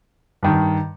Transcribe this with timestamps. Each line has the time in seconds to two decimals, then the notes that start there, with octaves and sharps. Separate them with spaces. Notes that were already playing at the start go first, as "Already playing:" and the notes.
0.43 G2 D#3